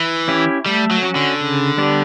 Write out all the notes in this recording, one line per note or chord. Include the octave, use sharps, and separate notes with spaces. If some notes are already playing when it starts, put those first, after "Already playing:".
Already playing: E3
C#4 E4 G4
G3 A3
F#3
C#4 F#4
D3
C#3
G3 B3 D4 G4